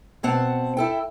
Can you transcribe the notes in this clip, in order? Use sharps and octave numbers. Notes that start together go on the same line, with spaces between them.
B2 C4 F#5 A5
E4 A4 G5